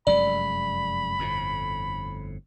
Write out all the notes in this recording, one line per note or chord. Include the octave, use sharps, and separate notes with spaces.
F1 F#2 G#3 D5 B5
G1 F2 A2